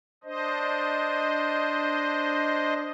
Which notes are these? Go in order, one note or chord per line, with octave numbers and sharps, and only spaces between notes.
D4 C5 D#5